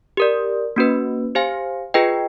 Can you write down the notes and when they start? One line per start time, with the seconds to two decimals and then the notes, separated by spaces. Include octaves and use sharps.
0.17 G4 A#4 D5
0.76 A#3 C#4 F#4 B4
1.35 G4 C5 F5 G#5
1.94 F4 G#4 B4 D#5 G5